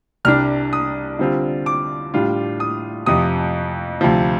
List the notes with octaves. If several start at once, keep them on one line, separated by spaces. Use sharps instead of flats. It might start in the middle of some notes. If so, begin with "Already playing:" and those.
C2 C3 G3 D4 F6
D#6
D3 G3 C4 F4
D6
A2 G3 D4 F4
D#6
F2 C3 F3 D#6
D2 C3 F3